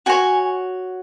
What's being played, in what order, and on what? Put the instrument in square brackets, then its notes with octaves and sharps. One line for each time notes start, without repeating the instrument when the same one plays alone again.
[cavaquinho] F#4 C#5 G#5